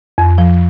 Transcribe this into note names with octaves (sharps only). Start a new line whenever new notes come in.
F2
F3